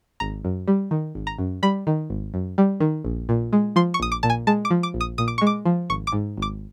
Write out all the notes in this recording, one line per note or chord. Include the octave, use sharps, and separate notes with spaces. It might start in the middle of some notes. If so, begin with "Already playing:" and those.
G#1 A#5
F#2
G3
D#3
G#1
A#5
F#2
G3 B5
D#3
G#1
F#2
G3
D#3
A#1
A#2
G#3
F3 C6
C#6
A#1 D#6
D6
A#2 A5
G#5
G#3 A5
D6
F3
D6
A#1
D#6
A#2 D#6
D6
G#3 C#6
D6
F3
G#1 C#6
D6
G#2
G#1 D6